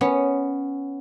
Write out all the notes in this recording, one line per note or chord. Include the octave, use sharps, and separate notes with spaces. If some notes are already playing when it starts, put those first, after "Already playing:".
B3 C#4